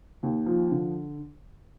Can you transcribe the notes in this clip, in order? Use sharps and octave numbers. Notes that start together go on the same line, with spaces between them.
D#2
F3
D3